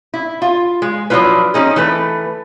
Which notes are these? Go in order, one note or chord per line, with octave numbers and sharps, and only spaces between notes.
E4
F4
G#3
F3 F#3 D4 E4 F4 B4
C4 C#4 D#4 G#4
E3 A3 B4